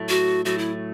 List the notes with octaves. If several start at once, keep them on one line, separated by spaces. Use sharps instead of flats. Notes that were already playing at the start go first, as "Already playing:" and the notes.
Already playing: A2 F#3 A3
F#4
A2 F#3 A3 F#4
E4